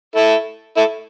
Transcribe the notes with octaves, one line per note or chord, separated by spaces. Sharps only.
E4 A4
E4 A4